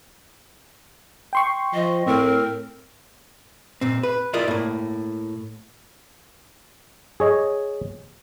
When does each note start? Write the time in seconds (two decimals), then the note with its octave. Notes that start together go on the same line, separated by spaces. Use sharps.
1.33 G5 C6 C#6
1.74 F3 D#5
2.07 A2 C4 A#4
3.81 A#2 C4
4.03 B4
4.33 E4 F4 A#4 D5 D#5
4.48 A2 A#3
7.20 G#4 C#5 D#5